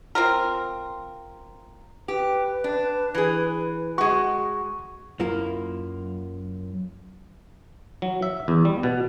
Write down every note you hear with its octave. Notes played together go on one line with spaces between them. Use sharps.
C4 F4 A#4
G4 B4
D4
E3 G#4
G#3 F#4 C#6
F#2 A#3 E4 F4 A#4
F#3
E5
E2
G3
B2